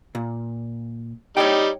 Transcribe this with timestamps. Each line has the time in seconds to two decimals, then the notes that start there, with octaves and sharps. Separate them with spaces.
0.15 A#2
1.37 G3 D#4 C#5 G5